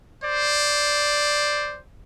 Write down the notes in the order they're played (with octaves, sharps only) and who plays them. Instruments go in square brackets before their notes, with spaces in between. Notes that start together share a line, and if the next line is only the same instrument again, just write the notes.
[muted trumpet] C5 [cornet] D5